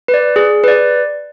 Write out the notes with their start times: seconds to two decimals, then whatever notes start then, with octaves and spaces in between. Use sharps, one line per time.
0.08 B4
0.14 D5
0.36 G#4
0.64 B4 D5